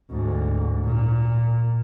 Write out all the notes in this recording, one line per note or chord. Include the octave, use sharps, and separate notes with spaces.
D2 G#2
A#2